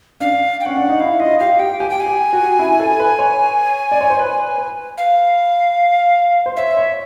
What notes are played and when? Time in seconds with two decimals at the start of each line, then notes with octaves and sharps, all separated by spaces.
0.20 D4 F5
0.61 G5
0.65 C#4 F#5
0.77 D4
0.89 D#4
1.00 E4 F5
1.20 F4 D#5
1.40 G4 F5
1.59 G4 G5
1.80 G4 G#5
1.90 G5
2.00 G#5
2.06 G4
2.33 F#4
2.59 E4
2.80 A4
3.00 B4
3.19 C#5
3.92 D5
4.01 C#5
4.10 C5
4.19 B4
4.58 B4
4.98 F5
6.46 C5
6.56 C#5 E5
6.77 C#5